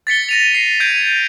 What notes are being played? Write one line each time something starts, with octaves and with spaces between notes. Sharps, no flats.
A6 B6 C#7 G7
A#6 D#7 F7
C7
G6 G#6 D7 D#7